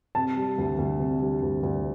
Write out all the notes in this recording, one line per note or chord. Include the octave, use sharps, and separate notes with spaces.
C3 A5
G3
D2
D2
C3
G3
D2
D2